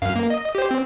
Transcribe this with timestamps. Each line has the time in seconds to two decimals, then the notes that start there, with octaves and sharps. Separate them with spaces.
0.02 F#2 F5
0.16 A#3
0.30 D#5
0.55 G4 C5
0.71 C4